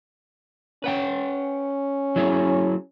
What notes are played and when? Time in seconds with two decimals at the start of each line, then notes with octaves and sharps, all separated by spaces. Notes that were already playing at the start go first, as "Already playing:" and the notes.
0.84 C#4 B4 F#5 G5
2.16 F#3 E4 G#4